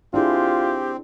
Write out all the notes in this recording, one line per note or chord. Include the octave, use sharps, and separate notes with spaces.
C4 D4 E4 F4 G4 G#4